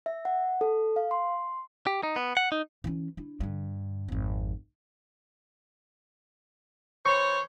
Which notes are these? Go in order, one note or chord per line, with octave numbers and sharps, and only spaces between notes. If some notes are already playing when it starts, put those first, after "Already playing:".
E5
F#5
A4
F5
C6
G4
D#4
B3
F#5
D#4
E3 C#4
D4 E4
G2 D3
G#1 F2
E3 C5 C#5 C#6